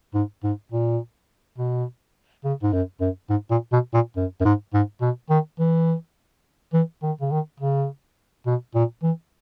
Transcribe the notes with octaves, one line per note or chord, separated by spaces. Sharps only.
G#2
G#2
A#2
B2
C#3
G#2
F#2
F#2
G#2
A#2
B2
A#2
F#2
F#2
G#2
G#2
B2
D#3
E3
E3
D#3
C#3
D#3
C#3
B2
A#2
E3